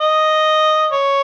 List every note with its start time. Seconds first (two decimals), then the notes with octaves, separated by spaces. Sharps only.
0.01 D#5
0.92 C#5